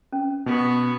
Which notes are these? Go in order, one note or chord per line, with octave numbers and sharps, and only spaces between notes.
C#4
B2 B3 F#4